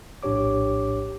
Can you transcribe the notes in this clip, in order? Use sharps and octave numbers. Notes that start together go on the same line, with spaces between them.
A#1 A2 D4 G4 C#5 D6